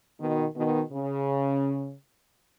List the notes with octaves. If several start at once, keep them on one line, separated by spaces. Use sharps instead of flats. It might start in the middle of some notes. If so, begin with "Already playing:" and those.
B2 D#3
B2 D#3
C#3